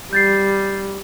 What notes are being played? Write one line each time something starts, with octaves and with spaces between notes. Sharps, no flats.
G3 G6 A6 C7